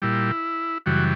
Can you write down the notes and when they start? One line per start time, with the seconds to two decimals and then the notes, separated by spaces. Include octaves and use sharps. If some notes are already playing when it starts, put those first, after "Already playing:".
0.02 A#2 G3 E4
0.86 F#2 C#3 E3 G3 F#4